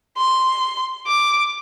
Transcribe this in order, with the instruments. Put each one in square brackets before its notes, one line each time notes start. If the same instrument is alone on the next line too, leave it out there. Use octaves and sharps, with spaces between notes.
[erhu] C6
D6